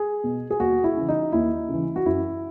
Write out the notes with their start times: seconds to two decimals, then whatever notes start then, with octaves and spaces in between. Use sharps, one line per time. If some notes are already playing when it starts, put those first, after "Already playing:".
Already playing: G#4
0.24 B2
0.51 G#4
0.60 D#2 F#4
0.84 E4
0.97 C#3 E3
1.09 D#4
1.32 D#2 E4
1.69 C#3 E3
1.96 F#4
2.06 F#2 E4